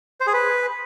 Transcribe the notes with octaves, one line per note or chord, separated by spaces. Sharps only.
C5
G#4
B4